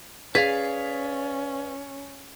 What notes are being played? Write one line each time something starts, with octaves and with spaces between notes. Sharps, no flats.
C#4 G#4 B4 D5 F5 B6